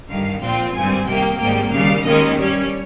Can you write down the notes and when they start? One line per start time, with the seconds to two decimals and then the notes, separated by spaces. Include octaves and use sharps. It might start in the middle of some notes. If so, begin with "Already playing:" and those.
0.09 G1 G2 D#3 F5
0.42 A#1 A#2 F3 C4 F4 G5
0.74 G#1 G2 G3 C4 G#5
1.07 C2 C3 D#3 A#3 G5
1.39 G#1 G#2 G3 A#3 G5
1.72 D#2 C#3 G3 F5
2.05 D#2 D#3 G#3 C#4 D#5
2.37 G2 G3 C#4 C#5